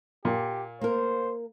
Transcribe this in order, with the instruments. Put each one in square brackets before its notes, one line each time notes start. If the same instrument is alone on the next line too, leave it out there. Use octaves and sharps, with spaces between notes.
[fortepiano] A#2 [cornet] G4
[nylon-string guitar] A#3 A#4 [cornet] C5